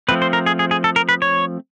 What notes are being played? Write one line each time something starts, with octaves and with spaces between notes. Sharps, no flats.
F3 A3 C4 B4
C5
A#4
G#4
G#4
G#4
A4
A#4
B4
C#5